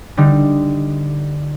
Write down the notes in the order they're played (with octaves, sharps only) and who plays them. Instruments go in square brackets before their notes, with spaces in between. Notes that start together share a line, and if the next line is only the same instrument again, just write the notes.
[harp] D3 G3 D#4